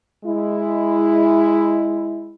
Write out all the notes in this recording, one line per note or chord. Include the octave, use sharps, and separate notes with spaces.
G#3 E4